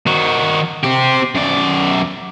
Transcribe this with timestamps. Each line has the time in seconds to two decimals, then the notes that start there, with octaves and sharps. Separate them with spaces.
0.07 D#3 F#4
0.83 C4 G4
1.35 F#2 D5